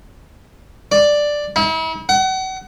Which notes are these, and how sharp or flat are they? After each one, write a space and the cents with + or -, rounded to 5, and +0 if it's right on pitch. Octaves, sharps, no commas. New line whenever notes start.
D5 +5
E4 -40
F#5 +35